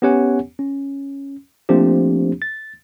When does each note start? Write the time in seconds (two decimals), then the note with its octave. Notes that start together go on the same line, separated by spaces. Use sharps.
0.02 B3 C#4 G4 C#5 F#5 G#5
0.59 C#4
1.69 F3 A3 A#3 C4 D4 G4
2.42 A6